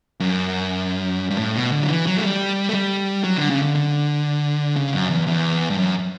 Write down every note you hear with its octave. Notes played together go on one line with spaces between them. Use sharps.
F#2
G2
A2
B2
D3
F#3
E3
F#3
A3
G3
A3
G3
F#3
D3
C#3
D3
D3
C#3
F#2
E2
E2
G2
F#2